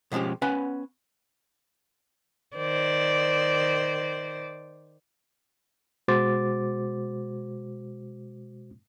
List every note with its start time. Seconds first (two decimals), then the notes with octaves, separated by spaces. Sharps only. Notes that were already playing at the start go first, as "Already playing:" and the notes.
0.12 B2 F3 G#3 C#4 G4
0.42 B3 C#4 B4 F#5 G#5 B5
2.57 D#3 C5 D5
6.08 B2 G#3 F#4 C5 D6 A6